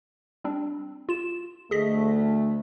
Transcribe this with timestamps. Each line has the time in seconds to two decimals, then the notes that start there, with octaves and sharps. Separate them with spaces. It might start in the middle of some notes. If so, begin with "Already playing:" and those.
0.44 G3 C4 D4
1.09 F4 E7
1.71 D2 A3 G#4 D#5 B6